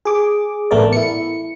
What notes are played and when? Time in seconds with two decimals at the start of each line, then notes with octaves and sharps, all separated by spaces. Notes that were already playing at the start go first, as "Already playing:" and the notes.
0.05 G#4 D6
0.71 A1 A3 B3 A#4 D5
0.93 E4 C#7